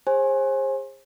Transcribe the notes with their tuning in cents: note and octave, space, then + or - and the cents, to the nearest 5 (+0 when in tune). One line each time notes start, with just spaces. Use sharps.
G#4 -35 C5 +35 G#5 +0